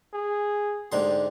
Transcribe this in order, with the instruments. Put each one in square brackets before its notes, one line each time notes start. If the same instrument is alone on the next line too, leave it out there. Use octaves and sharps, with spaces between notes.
[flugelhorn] G#4
[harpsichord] G#2 D3 C6 [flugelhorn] G4